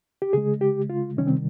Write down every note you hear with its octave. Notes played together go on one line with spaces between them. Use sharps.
G4
C#3 G#3 G#4
G4
F4
C3 D#3 G3 C#4
C4